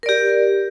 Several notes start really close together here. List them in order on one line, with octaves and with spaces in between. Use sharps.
A#4 D5 G4